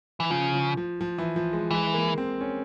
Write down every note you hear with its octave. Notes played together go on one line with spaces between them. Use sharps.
E3
C#3 F3
F3
F3
F3
E3
F3
G#3
E3 G#3
A#3
C4
C#4